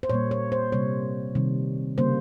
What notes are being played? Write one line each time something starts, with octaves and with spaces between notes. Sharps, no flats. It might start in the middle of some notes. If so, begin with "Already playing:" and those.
C5
A#2 G3 A#3 C#5
C#5
C5
C3 G3 A#3 C#5
C3 D#3 G3
C#3 G3 A#3 C5